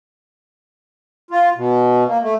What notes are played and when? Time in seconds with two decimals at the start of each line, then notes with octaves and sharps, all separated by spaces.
1.31 F4
1.56 B2
2.08 A#3
2.22 A3